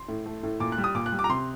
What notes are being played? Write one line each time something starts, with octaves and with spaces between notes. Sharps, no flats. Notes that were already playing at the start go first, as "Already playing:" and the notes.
Already playing: C6
A2
A3
A2
A#2 D6
F#6
G3
D#6
A#2 D6
F#6
G3
D6
A#5
C3 C6